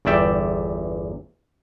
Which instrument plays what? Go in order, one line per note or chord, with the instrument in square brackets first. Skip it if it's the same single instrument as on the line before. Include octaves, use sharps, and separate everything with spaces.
[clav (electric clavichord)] G1 E2 D5 E5 G5